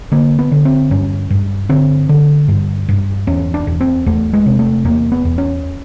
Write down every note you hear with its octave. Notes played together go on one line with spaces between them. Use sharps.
D3 A#3
B3
D3
C4
G2 C#4
G2
D3 C4
D3
G2
G2
E2 C#4
D4
E2
C4
E2 A3
G#3
C3
A3
E2 A#3
B3
E2
C#4